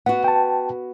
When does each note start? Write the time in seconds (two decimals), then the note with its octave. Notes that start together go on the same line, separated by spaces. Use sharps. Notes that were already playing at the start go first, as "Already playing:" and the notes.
0.06 B3 F#4 F#5
0.24 G5 A5